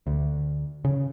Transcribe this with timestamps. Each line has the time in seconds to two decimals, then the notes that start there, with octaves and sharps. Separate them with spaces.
0.07 D2
0.85 C#3